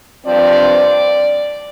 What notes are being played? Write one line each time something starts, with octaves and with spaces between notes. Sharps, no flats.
G2 F3 C4 D5